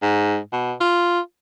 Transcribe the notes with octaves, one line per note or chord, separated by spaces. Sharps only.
G#2
B2
F4